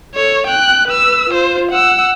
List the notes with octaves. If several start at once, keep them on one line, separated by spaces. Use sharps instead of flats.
A4 C#5
G5 F#6
B4 E6
F4 C5
F#5 E6